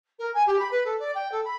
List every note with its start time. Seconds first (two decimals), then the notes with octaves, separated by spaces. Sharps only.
0.19 A#4
0.34 G#5
0.46 G4
0.59 B5
0.71 B4
0.85 A4
0.99 D5
1.15 G5
1.32 A4
1.44 B5